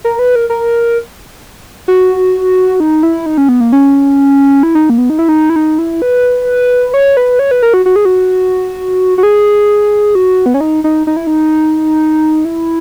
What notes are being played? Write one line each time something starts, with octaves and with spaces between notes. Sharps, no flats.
A#4
B4
A#4
A#4
F#4
D#4
E4
D#4
C#4
B3
A#3
C#4
E4
D#4
A#3
B3
D#4
E4
D#4
E4
D#4
E4
B4
C#5
B4
C#5
B4
A#4
F#4
F#4
G#4
F#4
F#4
G#4
F#4
B3
C#4
D#4
D#4
D#4
E4
D#4
E4